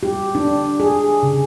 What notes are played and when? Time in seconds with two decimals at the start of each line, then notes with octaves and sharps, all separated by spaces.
0.03 G4
0.35 D4
0.80 G#4
1.23 C#3